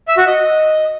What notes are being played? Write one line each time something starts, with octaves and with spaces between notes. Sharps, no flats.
E5
F#4
D#5